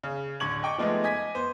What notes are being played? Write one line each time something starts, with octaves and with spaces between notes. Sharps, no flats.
C#3
D1 D3 C#6 G#6 F#7
D#5 G5 C#6 D6
F3 G#3 A3 B3 D#4
D#5 G#5 G#6 B6
B3 C5